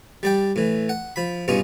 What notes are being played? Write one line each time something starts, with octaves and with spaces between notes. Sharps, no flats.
G3 D5 G5
A2 E3
F#5
F3 B5
G2 B2 C#4 D#4 F4